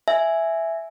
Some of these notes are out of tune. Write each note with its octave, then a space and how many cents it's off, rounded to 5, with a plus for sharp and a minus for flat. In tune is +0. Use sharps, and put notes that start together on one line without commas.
E5 +0 G#5 +0